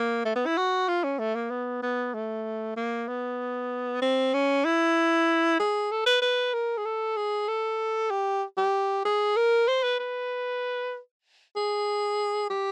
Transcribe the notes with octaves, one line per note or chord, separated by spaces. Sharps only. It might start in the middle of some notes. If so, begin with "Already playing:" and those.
Already playing: A#3
A3
B3
E4
F#4
F4
C#4
A3
A#3
B3
B3
A3
A#3
B3
C4
C#4
E4
G#4
A4
B4
B4
A#4
G#4
A4
G#4
A4
G4
G4
G#4
A#4
C5
B4
B4
G#4
G4